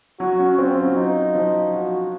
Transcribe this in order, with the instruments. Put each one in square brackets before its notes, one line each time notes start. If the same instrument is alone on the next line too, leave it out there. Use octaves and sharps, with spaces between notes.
[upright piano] F#3 [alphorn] F#4
[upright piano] C#4
[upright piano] C4 [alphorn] F4
[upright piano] C4
F#3
[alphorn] D#4
[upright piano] F3
[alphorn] F#4